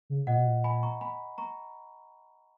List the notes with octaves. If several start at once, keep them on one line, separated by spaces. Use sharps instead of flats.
C#3
A#2 D#5 F#5
B2
A#2
G#5 B5
A#5 C#6
G#5 B5
A#5 C#6